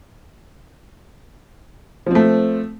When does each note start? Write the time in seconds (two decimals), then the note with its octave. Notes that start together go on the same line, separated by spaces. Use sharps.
2.06 F3
2.11 C4
2.15 A3